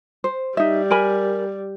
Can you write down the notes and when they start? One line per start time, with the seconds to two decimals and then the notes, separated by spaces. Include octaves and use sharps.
0.24 C5
0.57 G3 D#4 E5
0.91 A#4 G#5 B5